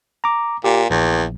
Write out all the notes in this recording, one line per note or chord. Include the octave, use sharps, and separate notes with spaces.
A#5 D6
A#2 G4
A#1 E2